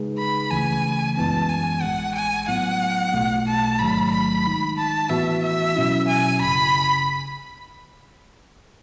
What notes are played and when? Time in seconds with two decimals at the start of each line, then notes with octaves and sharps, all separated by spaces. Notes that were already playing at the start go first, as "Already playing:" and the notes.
Already playing: C#3 G#3 D#4 G#4 B4
0.19 B5
0.51 C#2 C#3 E3 A3 G#5
1.17 F#2 E3 G#3 B3 A5
1.49 G#5
1.82 A1 A2 G#3 F#5
2.15 G#5
2.48 A2 F#3 B3 F#5
3.14 B1 B2 A3
3.47 A5
3.79 A1 G#2 D#3 F#3 A3 B5
4.12 B5
4.45 D#3 G#3 D#4
4.77 A5
5.10 A2 E3 B3 F#4 E5
5.43 E5
5.75 B2 F#3 C#4 E4
6.08 G#5
6.40 G#1 F#2 C#3 B5